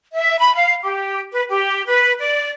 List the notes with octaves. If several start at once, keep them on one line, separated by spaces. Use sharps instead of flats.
E5
B5
F5
G4
B4
G4
B4
D5